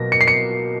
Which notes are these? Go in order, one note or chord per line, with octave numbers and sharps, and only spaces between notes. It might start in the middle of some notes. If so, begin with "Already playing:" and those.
Already playing: B2 F#3 A#3 A#6
C#7
C7
C#7